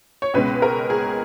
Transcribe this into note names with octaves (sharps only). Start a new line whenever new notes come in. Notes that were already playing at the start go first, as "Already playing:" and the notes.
C#5
C#2 B2 G#3 C#4 B4
A#4
G#4